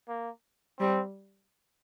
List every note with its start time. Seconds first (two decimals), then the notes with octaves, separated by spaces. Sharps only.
0.09 A#3
0.79 G3 C4